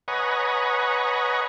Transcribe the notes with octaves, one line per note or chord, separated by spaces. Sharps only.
B4 C#5 D#5 F#5 G#5 A#5